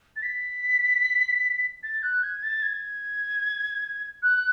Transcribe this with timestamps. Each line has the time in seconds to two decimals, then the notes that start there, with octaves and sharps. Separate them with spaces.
0.16 A6
0.22 B6
1.83 A6
2.02 F#6
2.23 G#6
2.43 A6
2.62 G#6
4.22 F#6